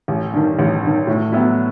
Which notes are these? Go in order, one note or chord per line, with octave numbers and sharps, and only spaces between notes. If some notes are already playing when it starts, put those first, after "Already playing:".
A1
G2 D#3
A1
G2 D#3
A2
F#3 B3 E4